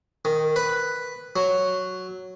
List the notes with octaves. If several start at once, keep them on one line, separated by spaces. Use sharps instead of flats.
D#3
B4
F#3